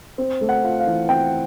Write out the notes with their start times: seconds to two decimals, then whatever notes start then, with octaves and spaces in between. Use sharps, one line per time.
0.18 C4
0.41 A3
0.49 F#5
0.64 F4
0.80 F5
0.87 E3
1.09 C4 G5